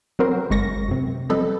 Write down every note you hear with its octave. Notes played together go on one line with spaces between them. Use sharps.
F#3 C4 F#4 A#4 C5
G1 G#3 C#6 A#6
F#2 C3
F3 G3 C4 A4 B4 D#5